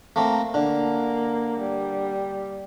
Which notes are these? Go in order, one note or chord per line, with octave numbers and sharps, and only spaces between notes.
A3 A#3 C4
D3 A#3
G3